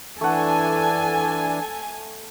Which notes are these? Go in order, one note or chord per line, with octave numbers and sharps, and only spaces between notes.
E3 A3 D4 A4 F#5 G#5